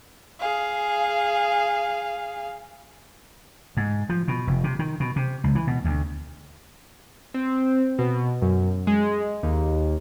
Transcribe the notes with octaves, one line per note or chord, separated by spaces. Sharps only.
G#4 F5
G#2
F3
B2
F1
C3
D#3
B2
C3
C#2
E3
B2
D2
C4
B2
F#2
G#3
D#2